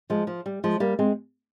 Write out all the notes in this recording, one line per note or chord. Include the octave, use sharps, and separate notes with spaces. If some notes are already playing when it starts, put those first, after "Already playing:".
F3 G#3
F3
G3
F3 G#3
G3 A#3
G#3 C4